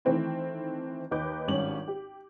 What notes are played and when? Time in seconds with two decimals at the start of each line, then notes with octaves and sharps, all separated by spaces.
0.05 D#3 E3 A3 C4 E4
1.11 D#2 D#4 B4 D6 G6
1.48 G#1 G2 C#4 F#7
1.88 G4